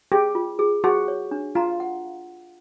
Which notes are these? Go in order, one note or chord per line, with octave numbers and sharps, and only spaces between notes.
G4 G#4
F4
G#4
F#4 G#4
C#5
D4
F4 A#5
F#5